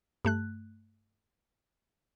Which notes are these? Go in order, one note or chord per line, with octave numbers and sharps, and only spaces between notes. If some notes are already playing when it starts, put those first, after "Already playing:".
G2 A3 F#6